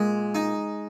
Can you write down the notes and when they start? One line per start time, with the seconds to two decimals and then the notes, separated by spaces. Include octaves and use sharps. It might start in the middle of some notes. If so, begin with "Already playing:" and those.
Already playing: A#2 G#3
0.35 D#4